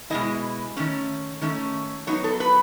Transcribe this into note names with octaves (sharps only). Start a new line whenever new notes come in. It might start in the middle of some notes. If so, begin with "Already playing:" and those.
B2 G#3 C#4 E4 D#5
D#3 A3 C#4
D#3 A3 C#4
F#3 B3 D#4 C#5
A4
B4